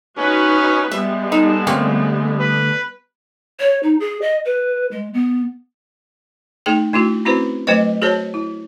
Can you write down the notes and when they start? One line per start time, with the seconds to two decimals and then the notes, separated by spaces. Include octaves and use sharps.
0.17 C#4 D#4 F#4 B4
0.91 G3 G#3 B3 E5
1.32 D#4 A4
1.67 D3 A3 A#3 C4 C#4
2.39 B4
3.60 C#5
3.83 D#4
4.00 G#4
4.22 D#5
4.45 B4
4.91 G#3
5.14 B3
6.66 A3 D#4 G#4 G5
6.93 A3 D4 E4 F#4
7.25 C4 C#4 E4 F#4 B4 C5
7.67 F#3 A3 B4 C5 D#5
8.02 F#4 G#4 A#4 C5 C#5 A5
8.34 E4